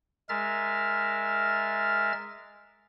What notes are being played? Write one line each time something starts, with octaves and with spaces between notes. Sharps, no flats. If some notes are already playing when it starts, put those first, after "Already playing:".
G#3 A#4 E5 F6 A6